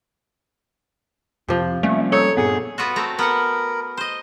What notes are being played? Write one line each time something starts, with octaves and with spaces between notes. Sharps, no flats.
F2 C3 F3
G3 A3 A#3 C#4
D#4 A4 C#5
G2 A#2 B3 G#4
B3 F4 F#4
A3 C4 A#5
B3 A#4 F#5
C5 D#5